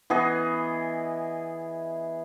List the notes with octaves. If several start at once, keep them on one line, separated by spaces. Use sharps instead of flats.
E3 B3 G#4 D#5